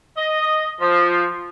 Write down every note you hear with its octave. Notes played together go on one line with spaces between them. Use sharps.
D#5
F3